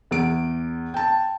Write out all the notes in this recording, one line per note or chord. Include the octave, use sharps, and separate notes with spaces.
E2 D7
G5 A5